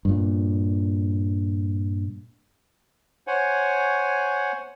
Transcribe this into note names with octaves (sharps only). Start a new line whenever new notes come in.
G2 A#2
C5 C#5 F#5 G#5